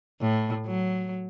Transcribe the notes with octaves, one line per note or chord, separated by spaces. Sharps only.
A2
F#3